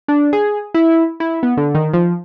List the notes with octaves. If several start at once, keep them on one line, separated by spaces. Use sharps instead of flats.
D4
G#4
E4
E4
B3
D3
D#3
F3